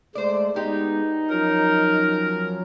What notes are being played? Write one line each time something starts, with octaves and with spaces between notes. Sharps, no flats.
G#3 A3 C5 D5
G#3 B3 D#4 G4
F3 F#3 C#4 A#4